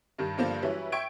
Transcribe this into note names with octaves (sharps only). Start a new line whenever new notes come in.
G2 D#3 G3
G2 D3 F3 A#3 D4
E3 F#3 G3 C#4 E4 B4
E5 G5 C#6 G#6 D7